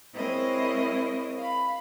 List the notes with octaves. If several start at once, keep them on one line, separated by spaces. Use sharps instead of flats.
G#3 C4 E4 A#4 C#5 D#5
F5 B5